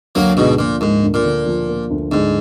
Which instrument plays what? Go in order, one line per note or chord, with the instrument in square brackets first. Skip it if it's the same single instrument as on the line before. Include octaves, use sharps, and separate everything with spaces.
[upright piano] D2 [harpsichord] F#3 A#3
[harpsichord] G#2 B2 [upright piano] D3
[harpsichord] A#2 [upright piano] F3
[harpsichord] G#2 [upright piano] A#3
[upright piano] D2
[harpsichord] A#2
[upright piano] D3
F3
A#3
D2
[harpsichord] G#2 [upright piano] D3